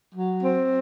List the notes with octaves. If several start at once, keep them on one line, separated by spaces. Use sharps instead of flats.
F#3
C4